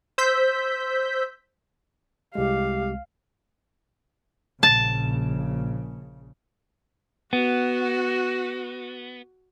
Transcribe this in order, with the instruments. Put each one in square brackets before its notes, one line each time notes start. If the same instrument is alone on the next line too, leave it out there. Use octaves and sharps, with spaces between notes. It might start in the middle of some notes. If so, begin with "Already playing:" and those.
[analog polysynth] C5 E6 G6 B6
[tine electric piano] C2 G#3 [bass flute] G4 [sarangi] F5
[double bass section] A#1 C#3 [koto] A5
[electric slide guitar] B3 [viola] F#4